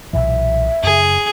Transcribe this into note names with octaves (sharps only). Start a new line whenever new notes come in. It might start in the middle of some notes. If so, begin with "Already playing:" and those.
B1 A#2 E3 E5
F#2 C#3 G#4